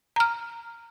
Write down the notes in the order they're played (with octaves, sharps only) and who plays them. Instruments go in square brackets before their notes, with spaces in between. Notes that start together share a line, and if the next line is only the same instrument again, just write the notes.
[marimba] A#5 F6